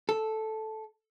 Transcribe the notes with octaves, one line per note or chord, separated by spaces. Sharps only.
A4